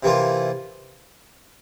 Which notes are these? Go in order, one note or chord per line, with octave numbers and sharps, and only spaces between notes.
C3 E3 A#3 F4